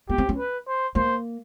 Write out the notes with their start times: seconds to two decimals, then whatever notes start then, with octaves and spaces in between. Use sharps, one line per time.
0.09 B3 G4
0.18 C4
0.29 C#4
0.38 B4
0.67 C5
0.95 A#3 C5